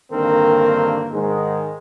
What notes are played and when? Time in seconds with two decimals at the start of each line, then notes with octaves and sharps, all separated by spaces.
0.11 G2 D3 D#3 A#3 C4 A#4
1.11 G#2 D#3 G#3